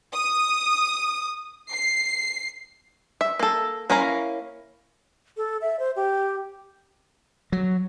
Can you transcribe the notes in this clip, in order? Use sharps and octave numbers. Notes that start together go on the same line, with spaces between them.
D#6
C7
E5
A#3 A4
A#3 C#4 E4 F5 A#5
A4
E5
C5
G4
F#3